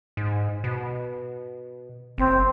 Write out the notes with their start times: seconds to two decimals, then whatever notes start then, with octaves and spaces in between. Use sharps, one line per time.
0.17 G#2
0.64 B2
2.18 F#1 C4